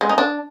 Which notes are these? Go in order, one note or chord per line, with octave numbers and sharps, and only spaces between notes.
G#3
D#4
D4